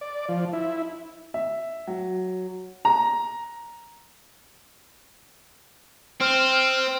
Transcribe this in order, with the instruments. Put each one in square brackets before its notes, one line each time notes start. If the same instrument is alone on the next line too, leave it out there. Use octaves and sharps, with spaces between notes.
[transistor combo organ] D5
F3
E4
[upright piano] E5
F#3
A#5
[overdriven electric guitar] C4 [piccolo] F6